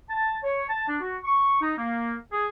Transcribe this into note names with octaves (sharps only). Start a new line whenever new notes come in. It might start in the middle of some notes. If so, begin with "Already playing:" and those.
A5
C#5
A5
D4
F#4
C#6
D#4
A#3
G#4